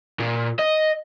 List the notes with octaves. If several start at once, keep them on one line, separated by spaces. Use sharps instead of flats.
A#2
D#5